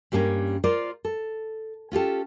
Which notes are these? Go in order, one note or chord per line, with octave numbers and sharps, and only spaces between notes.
G2 G3 A#3 C4 C#4
F4 A#4 C5 D5
A4
C#4 F4 G4 A4